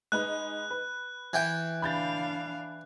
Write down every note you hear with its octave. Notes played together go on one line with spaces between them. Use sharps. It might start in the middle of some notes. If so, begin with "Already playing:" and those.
G#3 D#4 B4 F#6
B4
E3 G5
D4 F5 B5 G6 A6